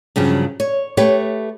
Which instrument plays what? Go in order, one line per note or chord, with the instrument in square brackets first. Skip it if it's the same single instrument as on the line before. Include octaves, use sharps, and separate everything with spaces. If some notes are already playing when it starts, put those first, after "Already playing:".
[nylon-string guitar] G2 C#3 F3 F#3
C#5
A3 G4 B4 C#5